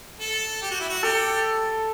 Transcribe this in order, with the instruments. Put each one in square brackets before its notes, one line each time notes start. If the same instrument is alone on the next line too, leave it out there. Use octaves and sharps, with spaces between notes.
[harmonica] A4
G4
F#4
E4
F#4
[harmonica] G4 [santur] A4